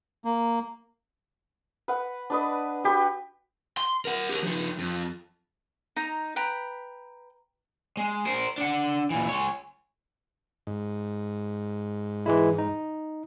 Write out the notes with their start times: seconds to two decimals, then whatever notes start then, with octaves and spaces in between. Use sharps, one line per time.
0.25 A#3
1.88 B4 F#5
2.30 D4 B4 D#5
2.84 F#4 G4 B4
3.77 C6
4.05 A#4 F#5
4.29 G4 A#4
4.43 F3 D#4
4.79 F2
5.96 D#4 A#5
6.36 B4 G5 A#5 B5
7.97 G#3
8.26 A#4 C5
8.58 D4 F#5
9.10 A#2 E3
9.29 G#3 C#5
10.67 G#2
12.26 E3 G#3 E4
12.58 D#4